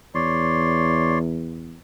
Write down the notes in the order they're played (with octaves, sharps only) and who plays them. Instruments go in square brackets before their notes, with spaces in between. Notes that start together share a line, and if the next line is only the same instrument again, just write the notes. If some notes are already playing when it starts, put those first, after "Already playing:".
[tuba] E2 [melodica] C#5 D5 C6